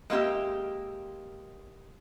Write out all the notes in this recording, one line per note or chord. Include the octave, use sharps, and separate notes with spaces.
G#3 A#3 E4 G4 E5